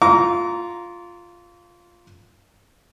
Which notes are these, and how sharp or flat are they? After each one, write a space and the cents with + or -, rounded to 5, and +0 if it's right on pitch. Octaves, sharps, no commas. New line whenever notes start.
F4 +0 A#5 +0 D6 -40